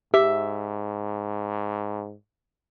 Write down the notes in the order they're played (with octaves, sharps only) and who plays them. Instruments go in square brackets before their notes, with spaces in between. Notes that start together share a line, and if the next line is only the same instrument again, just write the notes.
[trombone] G#2 [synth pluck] G4 [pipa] E5